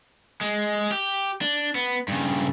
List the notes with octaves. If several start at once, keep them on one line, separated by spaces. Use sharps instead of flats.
G#3
G4
D4
B3
G2 C#3